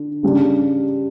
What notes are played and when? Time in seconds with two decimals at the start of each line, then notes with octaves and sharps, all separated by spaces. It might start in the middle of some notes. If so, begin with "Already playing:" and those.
Already playing: D3
0.23 C#3 G3 D4